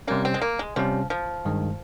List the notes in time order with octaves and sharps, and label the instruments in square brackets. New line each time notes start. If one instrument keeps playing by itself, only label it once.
[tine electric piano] C3 G3 C#4 [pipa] A#3
[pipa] C4
G#3
A#3
G#3
[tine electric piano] C3 G3 C#4 [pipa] F3
[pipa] F3
[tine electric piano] G2 D#3 G#3